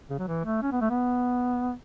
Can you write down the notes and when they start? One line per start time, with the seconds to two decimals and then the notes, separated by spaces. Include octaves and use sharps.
0.10 C#3
0.19 F#3
0.28 E3
0.45 A3
0.62 C#4
0.72 B3
0.81 A3
0.90 B3